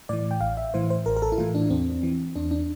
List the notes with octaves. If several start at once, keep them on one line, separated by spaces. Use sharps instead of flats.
A2 E3 D5
G5
A1 F5
E5
A2 E3 C5
C5
A1 A#4
A#4
A4
E4
A2 E3 F4
D4
E2 C4
E3
E2 D4
D4